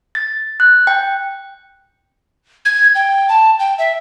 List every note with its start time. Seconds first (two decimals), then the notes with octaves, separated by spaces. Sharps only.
0.15 A6
0.60 F#6
0.87 G5
2.65 G#6
2.95 G5
3.29 A5
3.59 G5
3.78 E5